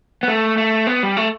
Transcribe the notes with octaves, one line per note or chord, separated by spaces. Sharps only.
B3
A3
A3
B3
G3
A3